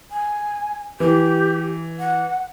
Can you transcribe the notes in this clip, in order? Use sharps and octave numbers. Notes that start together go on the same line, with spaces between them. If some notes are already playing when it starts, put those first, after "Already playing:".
G#5
E3 G4
F#5